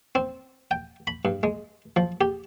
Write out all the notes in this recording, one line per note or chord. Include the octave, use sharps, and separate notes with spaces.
C4
G5
B5
G2
G#3
F3
G4